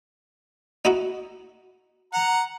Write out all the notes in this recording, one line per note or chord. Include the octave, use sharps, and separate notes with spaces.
D#4 E4 F#4
F#5 A#5